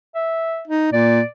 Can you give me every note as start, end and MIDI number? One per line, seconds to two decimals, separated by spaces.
0.15 0.62 76
0.68 0.90 63
0.93 1.21 46
0.93 1.24 74